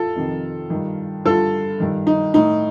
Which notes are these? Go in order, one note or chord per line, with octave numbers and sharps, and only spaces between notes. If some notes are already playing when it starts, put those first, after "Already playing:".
Already playing: F4 A4
F2 C3 D#3
G2 D#3
G2 D3 F4 A4
G2 D#3
D#4
A2 D#4